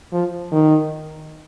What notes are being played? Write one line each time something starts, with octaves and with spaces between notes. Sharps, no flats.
F3
D#3